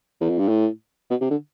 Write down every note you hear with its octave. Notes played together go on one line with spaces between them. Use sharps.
E2
F2
G2
A2
B2
C3
D3